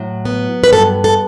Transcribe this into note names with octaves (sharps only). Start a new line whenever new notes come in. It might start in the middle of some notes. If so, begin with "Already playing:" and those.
Already playing: A2 F#3
B3
B4
G2 A4
A4